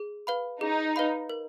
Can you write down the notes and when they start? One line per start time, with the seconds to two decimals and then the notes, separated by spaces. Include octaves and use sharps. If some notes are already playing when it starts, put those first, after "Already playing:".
Already playing: G#4
0.27 B4 F5 B5
0.61 D#4 G#4
0.96 B4 F5 B5
1.29 A#4